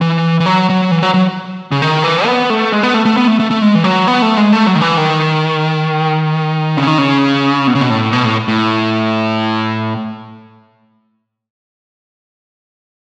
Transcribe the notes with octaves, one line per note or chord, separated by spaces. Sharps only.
E3
E3
F#3
F#3
E3
F#3
F#3
C#3
D#3
E3
B3
A3
G#3
B3
A3
A3
B3
A3
A3
A3
G#3
E3
F#3
B3
A3
G#3
A3
F#3
D#3
E3
D#3
C#3
D#3
C#3
B2
C#3
B2
A2
B2
A2
A2